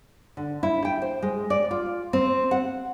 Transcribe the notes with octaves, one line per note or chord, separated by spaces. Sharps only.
D3
E4
G5
C5
G#3
D5
F4
C4
F#5